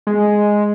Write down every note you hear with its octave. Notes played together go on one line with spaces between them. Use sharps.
G#3